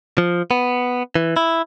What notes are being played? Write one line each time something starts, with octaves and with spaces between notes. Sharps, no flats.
F3
B3
E3
E4